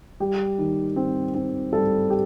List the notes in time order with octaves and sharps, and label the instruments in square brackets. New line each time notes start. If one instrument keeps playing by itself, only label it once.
[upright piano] G3 G4
D#3
C4
C4
G3 A4
G4